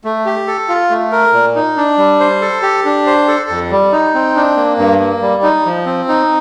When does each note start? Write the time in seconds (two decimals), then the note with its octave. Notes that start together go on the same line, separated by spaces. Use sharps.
0.04 A3
0.26 G4
0.47 A4
0.69 F4
0.90 A3
1.12 A#4
1.33 A#2
1.56 D#4
1.77 D4
1.98 G3
2.20 C5
2.42 A4
2.63 G4
2.85 D4
3.06 C5
3.28 A4
3.49 F2
3.71 G3
3.92 D#4
4.14 C4
4.36 D4
4.57 A#3
4.78 G2
5.00 A#3
5.22 G3
5.43 D#4
5.65 F3
5.86 C4
6.08 D#4